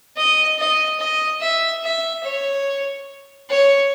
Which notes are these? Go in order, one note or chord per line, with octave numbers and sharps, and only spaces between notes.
D#5
D#5
D#5
E5
E5
C#5
C#5